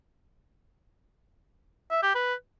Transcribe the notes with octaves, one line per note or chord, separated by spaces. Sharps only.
E5
G4
B4